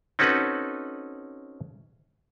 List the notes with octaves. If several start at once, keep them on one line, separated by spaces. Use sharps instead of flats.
C4 C#4 D#4 F#4 A4 B4